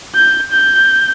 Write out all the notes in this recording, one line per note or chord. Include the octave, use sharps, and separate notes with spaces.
G6
G6